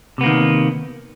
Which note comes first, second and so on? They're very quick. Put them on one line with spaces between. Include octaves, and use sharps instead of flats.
C3 B3 A#3 D#3